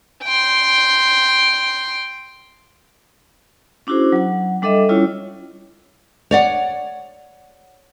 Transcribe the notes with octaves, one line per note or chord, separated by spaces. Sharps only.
G5 C6
C#4 D4 E4 F#4 G#4 C5
F#3 F#5
G3 D4 A4 D#5 E5
G3 C#4 E4 F4 C#5
C#5 D5 F#5